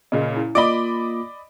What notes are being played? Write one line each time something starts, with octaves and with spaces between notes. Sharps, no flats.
A#2 C#3 D#5
E4
A#3 F4 D5 D#5 B5 D6 D7 G7